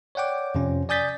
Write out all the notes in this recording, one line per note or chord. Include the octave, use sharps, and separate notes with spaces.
C#5 D5 F#5 G5 D6
F2 C3 F3 C#4
D5 G#5 D#6 G6 A6 B6